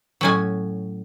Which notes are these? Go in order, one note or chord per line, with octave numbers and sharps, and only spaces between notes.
A2 F#3 C#4 G#5